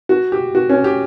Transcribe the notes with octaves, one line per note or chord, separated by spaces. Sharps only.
F#4
G4
F#4
C#4
G4